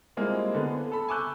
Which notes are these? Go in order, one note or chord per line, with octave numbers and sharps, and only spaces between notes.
G3 G#3 A#3 C4 E4 F4
D3 B3
A4 B5
G#5 C#6 D6 E6 F#6 G6